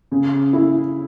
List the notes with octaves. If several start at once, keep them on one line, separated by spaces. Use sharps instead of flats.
C#3
E4